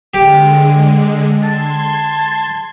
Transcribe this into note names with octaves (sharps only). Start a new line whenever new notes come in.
D3 G#3 G4
A5 C6 G#6